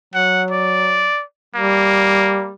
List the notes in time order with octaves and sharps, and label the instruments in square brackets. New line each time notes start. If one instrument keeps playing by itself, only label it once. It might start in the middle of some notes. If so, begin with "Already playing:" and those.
[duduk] F#3 [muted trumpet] F#5
[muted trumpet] D5
[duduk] G3 [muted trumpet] A#3